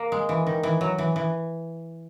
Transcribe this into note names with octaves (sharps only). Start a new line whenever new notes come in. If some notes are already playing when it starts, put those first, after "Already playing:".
Already playing: A#3
G#3
E3
D#3
E3
F#3
E3
E3